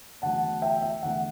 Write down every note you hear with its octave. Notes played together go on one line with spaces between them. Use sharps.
E2 D3 F#3 A3 F#5 A5
E5 G5
E5
E2 D3 A3 F#5